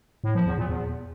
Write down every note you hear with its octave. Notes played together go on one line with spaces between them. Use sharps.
A2
F3
E2
A#2
E2